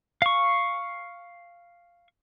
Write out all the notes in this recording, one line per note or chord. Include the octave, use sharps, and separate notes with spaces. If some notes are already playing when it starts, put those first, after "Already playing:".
F5 C#6